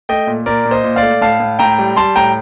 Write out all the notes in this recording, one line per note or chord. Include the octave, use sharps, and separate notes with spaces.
A3 D#5 G5
A#2
A#2 A#4 D5
A#2
C5 D#5
A#2
D5 F5
A3
A2 F5 A5
A2
A2 G5 A#5
G3
G3 A5 C6
A2 G5 A#5